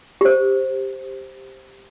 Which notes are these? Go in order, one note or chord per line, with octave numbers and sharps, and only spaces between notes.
G4 C5